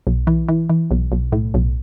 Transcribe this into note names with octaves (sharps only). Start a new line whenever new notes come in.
B1
E3
E3
E3
B1
B1
A2
B1